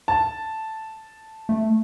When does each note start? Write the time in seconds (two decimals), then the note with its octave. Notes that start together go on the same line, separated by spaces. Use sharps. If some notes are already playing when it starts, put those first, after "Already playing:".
0.08 A5
1.49 A3